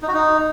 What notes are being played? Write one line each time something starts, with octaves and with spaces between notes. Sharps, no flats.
D#4
F#4
D#4